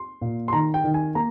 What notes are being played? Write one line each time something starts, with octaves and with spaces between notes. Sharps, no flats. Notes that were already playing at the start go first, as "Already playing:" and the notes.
Already playing: C6
A#2
C6
D#3 A#5
G5
D#3
G#5
A#3 A#5